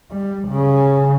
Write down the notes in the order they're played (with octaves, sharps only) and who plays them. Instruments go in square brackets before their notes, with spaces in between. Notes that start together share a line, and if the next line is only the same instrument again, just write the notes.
[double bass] G3
C#3